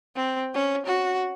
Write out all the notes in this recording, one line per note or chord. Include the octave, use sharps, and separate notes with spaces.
C4
C#4
F#4